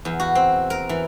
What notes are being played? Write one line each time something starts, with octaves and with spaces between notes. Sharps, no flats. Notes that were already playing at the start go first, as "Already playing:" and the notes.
E2
F#4
C4
A#4
E3